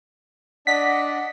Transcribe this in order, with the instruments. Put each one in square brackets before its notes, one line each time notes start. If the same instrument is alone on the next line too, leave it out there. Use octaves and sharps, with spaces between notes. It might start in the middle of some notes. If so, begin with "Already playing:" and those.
[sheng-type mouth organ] D4 D5 D#5 [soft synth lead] F#5 [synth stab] B6